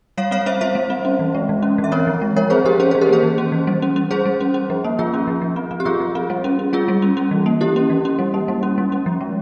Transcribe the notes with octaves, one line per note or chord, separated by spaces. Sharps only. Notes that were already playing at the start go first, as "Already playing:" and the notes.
G3 C#5 F5
C4 C#5 F5
C4 C5 E5
G3 C5 E5
G3
C4
C#4
E3
G#3
E3
C#4
E3
E5
C4 A#4 C#5
F3
G#3
F3 A#4 C#5
C4 G#4 C5
F3 G4 A#4
C#4 G#4 C5
G#4 C5
E3
G4 A#4
A#3 G#4 C5
E3
C#4
E3
G3
C#4
C#4
G3 G#4 C5
G3
C#4
C#4
F3
A#3
F3 F4 G#4
C#4
F3
F3
C4
C4
G4
F3 F4 G#4
F3
C4
G3
C#4
C#4
G3 F4 G#4
G3
C#4
C#4
E3
A#3
E3 E4 G4
C#4
E3
C#4
G3
A#3
G3
C#4
G3
C#4
F3
G#3